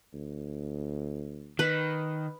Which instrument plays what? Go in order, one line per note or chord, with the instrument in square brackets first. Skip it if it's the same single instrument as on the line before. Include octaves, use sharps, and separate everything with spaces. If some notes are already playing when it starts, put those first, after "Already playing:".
[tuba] D2
[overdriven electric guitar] D#3 [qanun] B4